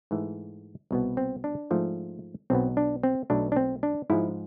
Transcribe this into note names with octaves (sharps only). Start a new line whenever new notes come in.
G#2 E3 A3
C2 B2 B3
C4
D4
G#2 F3 A3
B1 B2 B3 C4
D4
C4
B1 B2 A3 D4
D4
C4
D4
G#2 F3 G#3 E4